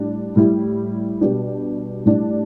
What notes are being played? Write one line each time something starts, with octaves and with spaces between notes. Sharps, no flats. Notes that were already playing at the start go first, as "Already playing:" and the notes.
Already playing: A2 G3 D4 G4
A2 G3 E4
B2 G3 D4 G4
A2 G3 D4